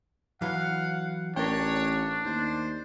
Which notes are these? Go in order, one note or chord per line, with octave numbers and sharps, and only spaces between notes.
E3 F#3 F5 F#5
A1 D4 A#4 C#5 G5
D#2 C5